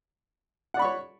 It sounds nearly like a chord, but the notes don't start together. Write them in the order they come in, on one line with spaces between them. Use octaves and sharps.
F#5 D5 B5 C#6 C#5